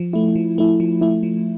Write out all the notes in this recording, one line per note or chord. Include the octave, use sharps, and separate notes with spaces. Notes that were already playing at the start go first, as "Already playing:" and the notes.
Already playing: F3
A3 E4
F3
A3 E4
F3
A3 E4
F3